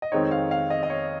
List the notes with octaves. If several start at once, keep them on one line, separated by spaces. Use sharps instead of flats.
D#5
F2 D#3 G#3 C4 D#4 C#5
F5
F5
D#5
D#5
C#5